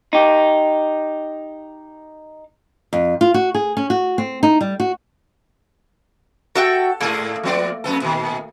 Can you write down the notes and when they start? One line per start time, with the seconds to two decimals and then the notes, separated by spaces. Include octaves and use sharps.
0.13 D#4 G4
2.93 F2
3.21 F4
3.34 F#4
3.54 G#4
3.77 C#4
3.90 F#4
4.18 C4
4.43 D#4
4.61 G3
4.80 F#4
6.55 F#4 A4 E5 G5
7.01 G#2 A3 A#3 G#4 A4
7.43 F3 B3 D5
7.84 F2 B3 A4
8.02 A#2 D#3